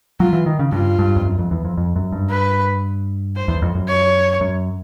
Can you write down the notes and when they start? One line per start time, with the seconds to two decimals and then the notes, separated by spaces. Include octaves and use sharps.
0.20 F#3 F4
0.33 E3
0.46 D#3
0.59 C#3
0.72 G2 F4
0.99 G2
1.16 F2
1.25 F#2
1.39 F2
1.51 E2
1.65 F2
1.77 F2
1.96 F#2
2.12 G2
2.30 B4
3.36 C5
3.48 E2
3.62 F2
3.75 F#2
3.88 C#5
4.41 F#2